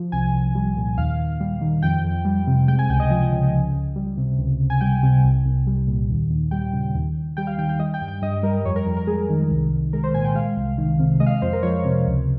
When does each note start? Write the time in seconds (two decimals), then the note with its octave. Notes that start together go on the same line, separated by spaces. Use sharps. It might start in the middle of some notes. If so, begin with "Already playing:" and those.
Already playing: F3
0.12 C2 G#5
0.33 C2
0.55 G3
0.76 A#2
0.97 D#2 F5
1.19 D#2
1.40 G3
1.61 D#3
1.83 F2 G5
2.04 F2
2.25 G3
2.47 C3
2.68 G#3 G5
2.79 G#5
2.90 C#2 G5
3.00 D#5
3.10 F3 G#5
3.32 C#3
3.53 C#2
3.75 C#2
3.96 G3
4.17 C3
4.39 C#2
4.60 C#2
4.70 G#5
4.81 G3 G5
5.03 C3
5.24 C2
5.45 C2
5.67 G3
5.87 A#2
6.10 D#2
6.30 D#2
6.51 G3 G5
6.73 C#3
6.95 D#2
7.15 D#2
7.37 G3 G5
7.47 F5
7.58 D#3 G5
7.69 G5
7.79 G3 D#5
7.94 G5
8.01 G2
8.08 G5
8.22 G2 D#5
8.43 G3 A#4
8.65 F2 C#5
8.76 A#4
8.86 F2
8.97 A#4
9.07 G#3 G#4
9.29 D#3
9.50 C2
9.71 C2
9.93 G#3 A#4
10.04 C5
10.14 A#2 G#5
10.24 G5
10.35 G#3 F5
10.57 C2
10.78 D#3
10.99 C3
11.20 G#3 D#5
11.26 F5
11.31 D#5
11.42 F2 C5
11.53 A#4
11.63 F3 C#5
11.85 C3
12.06 C#2